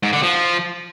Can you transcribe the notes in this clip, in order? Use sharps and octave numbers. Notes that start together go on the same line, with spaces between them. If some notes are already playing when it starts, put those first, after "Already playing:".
G#2
D3
F3